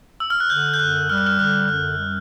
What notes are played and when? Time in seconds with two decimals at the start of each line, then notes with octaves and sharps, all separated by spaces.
0.20 E6
0.30 F6
0.40 F#6
0.50 D3 G6
0.74 G6
0.79 F#2 F#6
1.09 G3 F6
1.18 F#6
1.26 F6
1.39 D3 F#6
1.69 F#2 F#6
1.98 G3